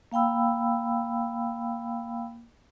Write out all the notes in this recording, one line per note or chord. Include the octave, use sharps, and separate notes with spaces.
A#3 F5 G5 B5 E6